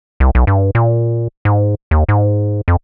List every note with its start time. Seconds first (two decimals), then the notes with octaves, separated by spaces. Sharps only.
0.20 C2
0.35 B1
0.47 G2
0.75 A#2
1.45 G#2
1.91 D#2
2.09 G#2
2.68 F2